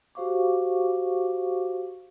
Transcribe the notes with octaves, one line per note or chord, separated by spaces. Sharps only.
F#4 G4 C5 F5 C#6 D6